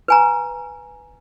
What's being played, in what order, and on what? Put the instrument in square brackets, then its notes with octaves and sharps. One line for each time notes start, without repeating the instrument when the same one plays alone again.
[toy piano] B4 G#5 A#5